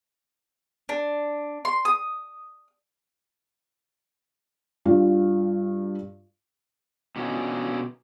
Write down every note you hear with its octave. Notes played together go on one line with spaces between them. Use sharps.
D4
C6
D#6
G2 G3 F4
B2 D3 A#3 C#4